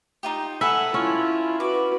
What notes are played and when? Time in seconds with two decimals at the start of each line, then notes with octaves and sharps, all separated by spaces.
0.23 D#4 F4 G4
0.61 A4 B4 E5 F#5 G#5
0.94 C#4 E4 F4
1.60 F#4 B4 D6